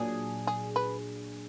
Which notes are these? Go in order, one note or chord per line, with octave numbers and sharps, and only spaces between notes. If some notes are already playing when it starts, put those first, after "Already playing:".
Already playing: A#2 F#3 D4 G#4
G#4
B4